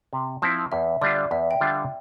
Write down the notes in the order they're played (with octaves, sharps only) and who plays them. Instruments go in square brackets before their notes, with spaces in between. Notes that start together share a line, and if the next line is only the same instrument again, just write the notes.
[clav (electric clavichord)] C3
[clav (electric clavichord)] F3 C4 E4 [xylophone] A5
[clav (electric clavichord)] E2 [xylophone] E5
[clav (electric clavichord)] D3 G3 D4 F4 [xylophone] D5
[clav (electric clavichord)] E2 [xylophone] E5
[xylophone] G5
[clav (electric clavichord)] D3 G3 D4 F4